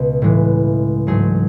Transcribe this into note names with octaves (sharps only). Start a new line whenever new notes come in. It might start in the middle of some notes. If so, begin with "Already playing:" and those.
Already playing: C#2 B2
A2 E3 G#3
G#2 F#3 A3 G#4